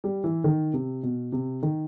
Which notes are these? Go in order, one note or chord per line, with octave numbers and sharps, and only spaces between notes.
G3
E3
D#3
C3
B2
C3
D#3